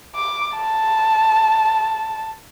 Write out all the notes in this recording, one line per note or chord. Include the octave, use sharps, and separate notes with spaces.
D6
A5